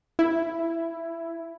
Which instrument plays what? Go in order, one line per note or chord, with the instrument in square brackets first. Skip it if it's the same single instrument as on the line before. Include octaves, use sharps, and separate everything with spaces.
[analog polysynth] E4